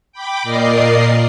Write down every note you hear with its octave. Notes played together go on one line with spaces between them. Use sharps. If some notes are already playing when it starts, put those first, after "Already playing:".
G5 B5 D6
A#2 A#4 D5 D#5 C7